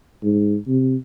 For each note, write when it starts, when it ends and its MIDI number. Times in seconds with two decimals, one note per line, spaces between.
0.23 0.57 44
0.67 0.95 48